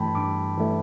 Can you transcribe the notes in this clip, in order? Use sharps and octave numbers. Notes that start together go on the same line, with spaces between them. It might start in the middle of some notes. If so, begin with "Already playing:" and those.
Already playing: G2 E3 A3 G5 A5 B5
G2 D6
E3 A3